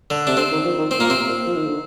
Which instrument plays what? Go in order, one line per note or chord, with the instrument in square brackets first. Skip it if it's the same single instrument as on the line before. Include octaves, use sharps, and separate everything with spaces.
[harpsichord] D3
[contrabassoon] C3 [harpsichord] D4
[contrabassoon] D3 [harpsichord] C4
[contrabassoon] D#3
F3
D#3
[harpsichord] C4
[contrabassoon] A#2 [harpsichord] A#3
[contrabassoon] C3 [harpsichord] C4
[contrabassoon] A#2
F3
D#3
D3